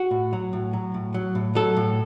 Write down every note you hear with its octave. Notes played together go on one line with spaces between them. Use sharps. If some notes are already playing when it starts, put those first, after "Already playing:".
Already playing: F#4
A2
F#3
A2
F#3
A2
F#3
A2
F#3 A4
A2